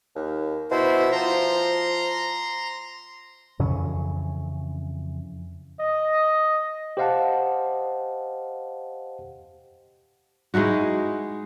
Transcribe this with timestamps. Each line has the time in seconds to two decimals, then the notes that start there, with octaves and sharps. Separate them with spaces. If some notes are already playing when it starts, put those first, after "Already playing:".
0.16 D#2
0.71 B2 E4 C5
1.12 F3 A#5 C6
3.59 F2 C#3 E3 C#4
5.80 D#5
6.97 G4 C5 D#5 F5 F#5 A5
10.54 G#3 D#4 E4 F#4